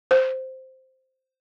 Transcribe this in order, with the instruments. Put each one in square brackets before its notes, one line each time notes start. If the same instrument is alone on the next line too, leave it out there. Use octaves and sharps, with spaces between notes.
[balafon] C5